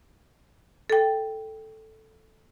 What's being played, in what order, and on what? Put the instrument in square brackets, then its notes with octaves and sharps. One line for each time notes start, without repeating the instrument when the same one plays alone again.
[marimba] A4 G5